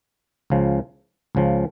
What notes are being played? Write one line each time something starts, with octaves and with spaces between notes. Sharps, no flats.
C#2 C#3 F3
C#2 C#3 F3